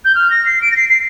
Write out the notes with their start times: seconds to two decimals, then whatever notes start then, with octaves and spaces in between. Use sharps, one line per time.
0.05 G6
0.15 F6
0.30 A#6
0.46 C7
0.62 D7
0.72 A#6
0.76 C7
0.89 C7